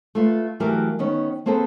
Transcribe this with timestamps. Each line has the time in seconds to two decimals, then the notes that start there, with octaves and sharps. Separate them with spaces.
0.15 A3 F4 B4
0.60 E3 F#3 A3 G4 A#4 F5
0.99 D#3 B3 C#4
1.46 A#3 C4 G#4 A4 B4